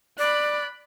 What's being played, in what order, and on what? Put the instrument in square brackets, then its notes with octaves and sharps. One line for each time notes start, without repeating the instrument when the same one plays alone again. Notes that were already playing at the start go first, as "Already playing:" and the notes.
[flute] D5 [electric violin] B5 F#6